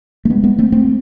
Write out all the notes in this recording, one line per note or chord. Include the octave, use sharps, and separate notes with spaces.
A3
G#3 B3
G#3 B3
A3 C4
A3 C4